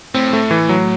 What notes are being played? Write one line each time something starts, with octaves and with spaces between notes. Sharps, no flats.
A2 C4
A3
E3
F#3